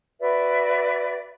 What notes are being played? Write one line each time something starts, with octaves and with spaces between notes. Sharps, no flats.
F#4 B4 D5 E5